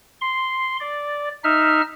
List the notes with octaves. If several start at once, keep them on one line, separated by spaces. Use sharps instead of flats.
C6
D5
D#4 E5 F6